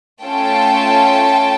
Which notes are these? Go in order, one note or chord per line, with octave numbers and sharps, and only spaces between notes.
A3 C#4 F4 A4 G5 A5